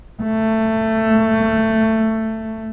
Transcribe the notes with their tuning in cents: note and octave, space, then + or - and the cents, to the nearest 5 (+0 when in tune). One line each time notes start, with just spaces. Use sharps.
A3 +15